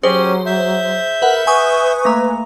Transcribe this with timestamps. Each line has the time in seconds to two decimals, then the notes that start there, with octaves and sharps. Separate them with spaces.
0.03 F#3 C#4 G4 G#4 C5
0.46 E5 G6
1.22 A#4 B4 F#5
1.47 B4 G#5 C#6 D#6
2.05 A3 A#3 A#5